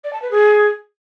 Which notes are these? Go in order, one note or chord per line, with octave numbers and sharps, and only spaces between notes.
D5
A5
B4
G#4